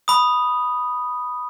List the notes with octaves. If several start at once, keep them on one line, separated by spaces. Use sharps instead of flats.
B5 D#6